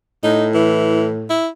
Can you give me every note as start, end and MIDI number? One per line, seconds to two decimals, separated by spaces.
0.23 1.39 45
0.23 0.47 63
0.54 1.11 52
1.30 1.48 64